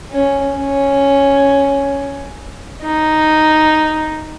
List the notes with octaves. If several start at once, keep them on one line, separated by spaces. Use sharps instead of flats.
C#4
C#4
D#4